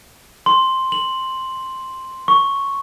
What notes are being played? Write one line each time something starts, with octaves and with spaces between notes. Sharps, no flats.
C6
F#7
C#6